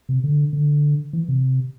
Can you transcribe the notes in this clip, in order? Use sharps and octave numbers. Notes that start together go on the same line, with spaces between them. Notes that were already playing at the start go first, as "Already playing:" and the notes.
C3
D3
D3
E3
C3